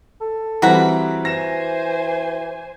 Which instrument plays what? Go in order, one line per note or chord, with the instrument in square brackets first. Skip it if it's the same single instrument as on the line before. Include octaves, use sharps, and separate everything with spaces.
[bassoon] A4
[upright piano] E3 G3 C4 [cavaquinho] F#4 A#5 B5
[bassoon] E3 [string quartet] C5 G#5 [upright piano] A#6 E7